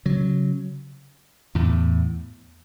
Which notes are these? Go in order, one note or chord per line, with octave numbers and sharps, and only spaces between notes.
C#3 F#3
E2 A2